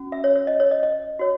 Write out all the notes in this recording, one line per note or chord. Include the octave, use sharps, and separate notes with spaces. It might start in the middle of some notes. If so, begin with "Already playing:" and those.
Already playing: C#4 F#4
E5
C#5
C#5
D#5
C#5
D#5
D#5
F#4 C#5